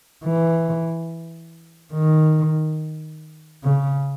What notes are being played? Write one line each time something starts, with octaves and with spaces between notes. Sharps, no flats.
E3
D#3
C#3